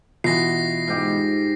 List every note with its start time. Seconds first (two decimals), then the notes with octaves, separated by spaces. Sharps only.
0.24 B2 E3 F4 F#4 A#6 C7
0.88 G#2 G4